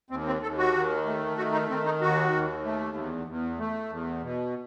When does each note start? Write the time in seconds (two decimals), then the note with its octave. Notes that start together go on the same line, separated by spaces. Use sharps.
0.10 D#2 C4
0.27 C4
0.42 D#2 A4
0.58 F#4
0.74 D#3
1.06 A3
1.37 D#3 F#4
1.53 D#4
1.69 D#3 C4
1.85 D#4
2.01 D#2 F#4
2.32 D#2
2.64 A3
2.96 E2
3.27 E2
3.59 A3
3.90 E2
4.23 B2